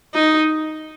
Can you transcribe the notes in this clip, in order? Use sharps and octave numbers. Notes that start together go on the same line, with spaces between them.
D#4